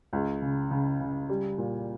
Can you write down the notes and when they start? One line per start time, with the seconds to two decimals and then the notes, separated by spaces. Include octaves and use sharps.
0.13 C#2
0.42 C#3
0.71 C#3
1.00 C#3
1.30 G3
1.58 A#2